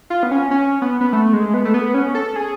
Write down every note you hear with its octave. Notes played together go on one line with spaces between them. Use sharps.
F4
B3
C#4
C#4
B3
B3
A3
G#3
B3
A3
B3
C#4
A4
G#4